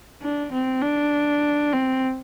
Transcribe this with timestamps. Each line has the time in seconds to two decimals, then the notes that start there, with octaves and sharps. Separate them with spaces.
0.22 D4
0.52 C4
0.82 D4
1.73 C4